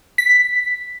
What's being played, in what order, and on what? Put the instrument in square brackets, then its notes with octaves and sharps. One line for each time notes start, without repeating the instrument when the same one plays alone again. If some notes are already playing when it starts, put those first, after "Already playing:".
[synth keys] B6